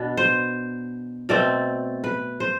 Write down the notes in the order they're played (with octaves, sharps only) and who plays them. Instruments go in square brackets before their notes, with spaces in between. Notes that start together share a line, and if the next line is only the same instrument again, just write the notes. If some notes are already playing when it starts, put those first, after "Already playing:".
Already playing: [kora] B2 B3 D4
C5
B2 A3 C4 D5
B4
C5